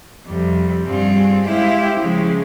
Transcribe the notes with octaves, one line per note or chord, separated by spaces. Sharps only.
F2 C3 G3
G2 G3 C4 F4 G#4
G#3 E4 G4 C5 F5
C#3 F3 G#3